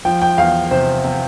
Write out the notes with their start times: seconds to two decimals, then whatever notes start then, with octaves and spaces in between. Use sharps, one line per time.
0.05 F3 G5
0.22 G5
0.38 E2 F5
0.71 C3 C5
1.04 C3